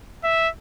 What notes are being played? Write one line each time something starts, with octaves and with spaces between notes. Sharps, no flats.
E5